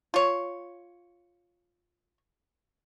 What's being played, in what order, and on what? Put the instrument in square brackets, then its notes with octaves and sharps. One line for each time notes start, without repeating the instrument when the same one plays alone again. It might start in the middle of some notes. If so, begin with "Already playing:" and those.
[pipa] F4 C#5